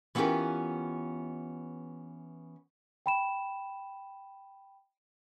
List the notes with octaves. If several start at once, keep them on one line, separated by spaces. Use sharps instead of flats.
E3 B3 C#4 F4 G4 A#4
G5 B5 E7